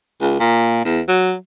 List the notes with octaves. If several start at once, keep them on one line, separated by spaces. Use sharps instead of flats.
C#2
A#2
E2
F#3